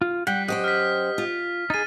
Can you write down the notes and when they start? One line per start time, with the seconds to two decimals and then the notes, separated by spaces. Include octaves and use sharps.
0.02 F4
0.27 G3 F#5 G5 B6
0.48 F#2 G4 C5 D#5 F#5 G5
0.64 F6 B6
1.18 F4
1.70 D#4 G#4 A6 D#7